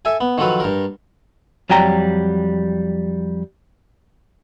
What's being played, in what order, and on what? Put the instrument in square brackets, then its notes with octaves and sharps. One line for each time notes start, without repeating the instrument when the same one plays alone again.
[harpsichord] A4 E5 G#5
B3
D#3 F3 F#3 A4 B4
G2 A#4
[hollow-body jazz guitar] F2 F#3 G3 G5 A#5